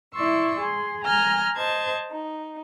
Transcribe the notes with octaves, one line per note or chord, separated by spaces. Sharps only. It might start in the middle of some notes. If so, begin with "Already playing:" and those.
E4 D5 C6 C#6 E6
G#4 C6
G#5 A#5 F6 G6
C5 D#5 A5 G#6
D#4